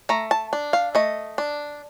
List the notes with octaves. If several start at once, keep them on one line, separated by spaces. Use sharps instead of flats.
A3 A#5
A5
D4
F5
A3 D#5
D4